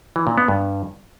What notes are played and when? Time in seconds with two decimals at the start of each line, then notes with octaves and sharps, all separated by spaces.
0.16 E3
0.27 A#2
0.38 B3
0.48 G2